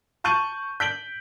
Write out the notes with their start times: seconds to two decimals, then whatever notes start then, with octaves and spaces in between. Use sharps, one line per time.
0.24 A5 C#6 G6 A6 D#7 F#7
0.80 G6 B6 D7 F#7 G7